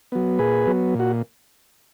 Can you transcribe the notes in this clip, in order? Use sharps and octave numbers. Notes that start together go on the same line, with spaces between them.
F#3 B3
A#2 G#4 B4
F#3 B3
A#2 F#4